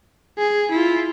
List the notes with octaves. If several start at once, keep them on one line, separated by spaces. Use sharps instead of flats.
G#4
E4 F4